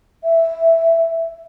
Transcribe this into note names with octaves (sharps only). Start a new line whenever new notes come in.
E5